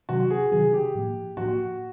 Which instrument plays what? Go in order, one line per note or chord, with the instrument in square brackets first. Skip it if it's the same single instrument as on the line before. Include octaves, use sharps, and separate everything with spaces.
[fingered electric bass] C3 D#3 F#3 [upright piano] F#4
[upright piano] G#4
[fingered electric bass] C3 D#3 F#3 [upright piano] G#4
[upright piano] G4
[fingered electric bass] A2 F3 A#3
[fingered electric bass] A2 F3 A#3 [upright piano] F#4